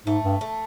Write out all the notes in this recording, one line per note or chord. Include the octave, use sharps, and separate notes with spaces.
G#2 A3
G2
A3